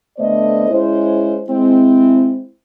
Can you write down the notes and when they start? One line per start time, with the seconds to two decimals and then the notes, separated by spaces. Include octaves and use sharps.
0.18 D3 A3 B3 C5 D5 D#5
0.70 G#3 C#4 E4 C5
1.49 G#3 C4 E4